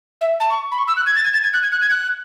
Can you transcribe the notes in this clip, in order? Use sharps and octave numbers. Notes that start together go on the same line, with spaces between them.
E5
A5
C#6
B5
C#6
E6
F#6
G#6
A6
G#6
A6
G#6
F#6
G#6
F#6
G#6
F#6